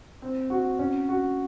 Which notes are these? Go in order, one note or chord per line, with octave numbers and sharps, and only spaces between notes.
C4
F#4
C#4
F#4